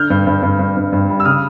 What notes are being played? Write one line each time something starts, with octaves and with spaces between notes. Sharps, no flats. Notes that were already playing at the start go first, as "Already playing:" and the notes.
Already playing: D3 F6 G6
G2
G2
G2
G2
G2
G2
G3
E6
C#3 D#6 F6